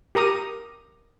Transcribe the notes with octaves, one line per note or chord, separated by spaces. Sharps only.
G4 A#4 A#5 D#6